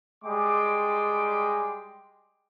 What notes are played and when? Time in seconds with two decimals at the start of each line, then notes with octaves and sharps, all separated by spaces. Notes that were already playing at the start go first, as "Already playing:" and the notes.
0.24 G3 G#3 G5 C6 D6